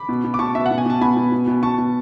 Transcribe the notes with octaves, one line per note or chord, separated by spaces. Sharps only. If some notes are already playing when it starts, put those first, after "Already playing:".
Already playing: B5 D6
B2
B2
D6
B2 A5 C#6
B2 E5
F#5
B2
G#5
B2 A5
B2 G#5 B5
B2
B2
B2
B2 A5 C#6
B2